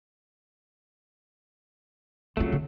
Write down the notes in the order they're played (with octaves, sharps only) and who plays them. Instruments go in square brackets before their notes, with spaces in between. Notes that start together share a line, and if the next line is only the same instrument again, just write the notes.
[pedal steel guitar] C#3 F#3 A3 [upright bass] C4 F4
[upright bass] D3